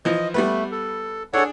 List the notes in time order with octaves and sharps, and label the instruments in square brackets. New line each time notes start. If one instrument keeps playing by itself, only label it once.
[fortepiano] E3 F3 [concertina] D#5
[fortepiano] G3 B3 B4 [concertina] A3
[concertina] A4
[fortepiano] D4 G#4 [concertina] A4 C#5 F#5